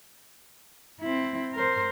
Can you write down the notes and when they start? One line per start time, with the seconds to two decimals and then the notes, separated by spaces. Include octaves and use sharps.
1.01 C4 E4
1.54 A#4 C5